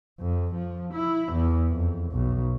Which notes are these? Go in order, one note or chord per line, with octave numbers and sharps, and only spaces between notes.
F2
F3
E4
E2
F2
B1